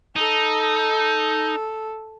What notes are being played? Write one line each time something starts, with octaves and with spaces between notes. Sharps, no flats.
D#4 A4